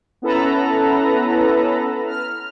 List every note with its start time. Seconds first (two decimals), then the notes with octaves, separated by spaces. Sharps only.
0.22 B3 C#4 E4 A4 B4 A#5
2.07 F6